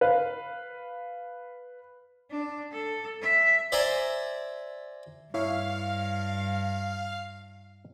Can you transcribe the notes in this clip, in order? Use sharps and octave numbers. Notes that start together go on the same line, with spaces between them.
B4 F5
D4
A4
E5
C5 D5 E5 G#5 A#5
G2 E4 C#5 E5 F5